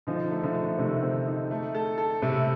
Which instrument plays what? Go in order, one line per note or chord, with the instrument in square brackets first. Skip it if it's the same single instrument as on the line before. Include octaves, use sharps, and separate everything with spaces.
[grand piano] D3 F3 [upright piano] D#4
[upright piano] A3
[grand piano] D3 F3
[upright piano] A3
[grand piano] C3 D#3 [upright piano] A3
[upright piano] C4
D#4
A3
A4
A4
[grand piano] A2 C3 [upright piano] A3